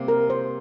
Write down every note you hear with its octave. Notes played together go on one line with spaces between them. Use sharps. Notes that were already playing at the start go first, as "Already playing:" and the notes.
Already playing: C3 G3 A#3
A#4
C5